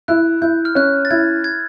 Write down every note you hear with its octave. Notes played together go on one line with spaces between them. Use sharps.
E4 F#6
E4 G6
F6
C#4 F#6
A6
E4 G#6
G#6